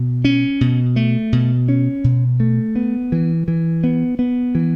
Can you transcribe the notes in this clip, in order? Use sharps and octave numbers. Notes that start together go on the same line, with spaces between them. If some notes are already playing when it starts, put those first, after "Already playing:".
Already playing: B2
C#4
B2
A3
B2
C#4
B2
A3
B3
E3
E3
B3
B3
E3